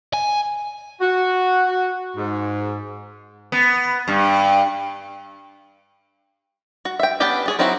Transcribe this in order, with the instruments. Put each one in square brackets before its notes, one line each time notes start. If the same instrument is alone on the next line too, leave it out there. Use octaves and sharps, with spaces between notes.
[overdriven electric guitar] G#5
[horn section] F#4
G#2
[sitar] B3
G2
[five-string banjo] F#4
E5 G5
B3 C#4 D4 G4 G5
D4 G#4 C#5
F#3 C4 D#4 E4 F#4